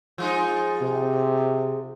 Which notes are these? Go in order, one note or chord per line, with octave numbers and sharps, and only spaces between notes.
F3 G#3 D#4
C3